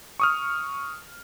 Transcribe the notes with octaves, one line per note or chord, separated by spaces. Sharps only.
C#6 D#6 F6